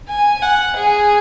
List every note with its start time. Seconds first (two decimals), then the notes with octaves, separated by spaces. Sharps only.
0.09 G#5
0.42 F#5
0.76 G#4